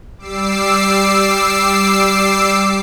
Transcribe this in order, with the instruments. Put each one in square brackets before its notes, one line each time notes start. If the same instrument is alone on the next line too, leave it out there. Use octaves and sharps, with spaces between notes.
[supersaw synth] G3 D6 E6 C7